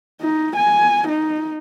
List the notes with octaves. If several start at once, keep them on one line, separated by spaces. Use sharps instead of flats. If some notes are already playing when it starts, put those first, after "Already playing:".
D#4
G#5
D#4